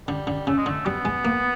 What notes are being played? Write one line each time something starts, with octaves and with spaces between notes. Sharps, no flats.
D3 G3
D3
C#3 A3
G#3
D3 A3
G3 B3
G#3
A#3